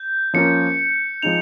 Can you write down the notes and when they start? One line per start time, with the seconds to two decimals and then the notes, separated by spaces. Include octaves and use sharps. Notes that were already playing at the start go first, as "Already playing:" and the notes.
Already playing: G6
0.34 F3 A#3 C#4 F4 A#4 C#7
1.22 F3 G#3 D#4 F7